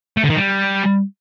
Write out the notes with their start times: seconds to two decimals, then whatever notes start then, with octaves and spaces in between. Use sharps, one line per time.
0.17 A3
0.23 D3
0.30 D#3
0.36 G3